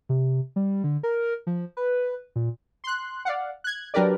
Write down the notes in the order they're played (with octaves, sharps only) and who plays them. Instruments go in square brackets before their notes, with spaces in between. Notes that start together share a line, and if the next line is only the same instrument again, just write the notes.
[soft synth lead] C3
G3
D3
A#4
F3
B4
A#2
[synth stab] C6 F#6
D5 F5 F#5
F#6 G#6
F#3 D4 G4 A#4 B4 D5